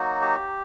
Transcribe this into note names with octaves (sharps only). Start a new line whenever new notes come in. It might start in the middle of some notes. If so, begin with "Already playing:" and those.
Already playing: F#3 A#3 D#4 F#4
G4